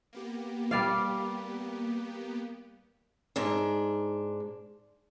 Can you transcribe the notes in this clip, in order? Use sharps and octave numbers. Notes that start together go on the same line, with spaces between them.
A#3 B3 G4
G3 D5 F5
G#2 D4